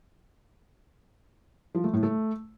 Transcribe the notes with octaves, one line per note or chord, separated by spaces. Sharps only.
F3
A3
A2
A3